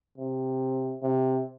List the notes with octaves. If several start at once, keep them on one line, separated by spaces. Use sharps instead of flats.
C3
C3